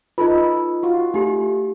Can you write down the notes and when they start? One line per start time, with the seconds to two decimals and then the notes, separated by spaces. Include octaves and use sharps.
0.18 D#4 F4 A4 B4
0.83 F4 F#4
1.14 A3 D#4 G4